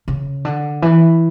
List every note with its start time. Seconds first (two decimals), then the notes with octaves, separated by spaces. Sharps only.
0.08 C#3
0.45 D3
0.82 E3